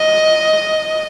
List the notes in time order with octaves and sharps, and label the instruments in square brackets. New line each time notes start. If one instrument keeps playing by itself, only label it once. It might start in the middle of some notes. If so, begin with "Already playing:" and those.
Already playing: [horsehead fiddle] D#5